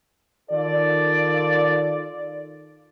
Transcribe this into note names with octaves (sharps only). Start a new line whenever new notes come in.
D#3 F4 A4 D5